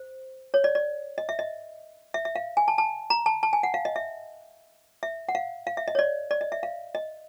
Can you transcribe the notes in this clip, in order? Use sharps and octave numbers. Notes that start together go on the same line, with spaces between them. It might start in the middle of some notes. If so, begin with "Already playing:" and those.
Already playing: C5
C#5
D5
D5
D#5
E5
D#5
E5
E5
F5
G#5
A5
A5
A#5
A5
A5
G#5
F#5
F5
D#5
E5
E5
F#5
F5
F5
E5
D#5
C#5
D5
D5
D#5
E5
F5
D#5